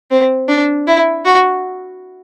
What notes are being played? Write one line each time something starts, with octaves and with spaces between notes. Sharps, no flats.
C4
D4
E4
F#4